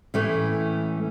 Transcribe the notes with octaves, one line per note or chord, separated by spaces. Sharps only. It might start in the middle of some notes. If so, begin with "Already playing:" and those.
A2 E3 A3 C#4